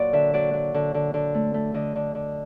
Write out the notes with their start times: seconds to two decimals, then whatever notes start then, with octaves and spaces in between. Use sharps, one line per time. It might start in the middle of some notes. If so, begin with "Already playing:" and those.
Already playing: A#2 F#3 D5
0.13 D3 E5
0.34 F#3 D5
0.54 F#3
0.74 D3
0.94 D3
1.14 D3
1.35 A3
1.54 A3
1.74 D3 D#5
1.96 D3
2.15 D3